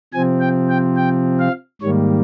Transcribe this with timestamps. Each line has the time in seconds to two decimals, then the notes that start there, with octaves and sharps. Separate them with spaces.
0.13 C3 F3 C4 G#5
0.41 G5
0.70 G5
0.97 G5
1.40 F5
1.82 G#2 D#3 G3 A#3 C#5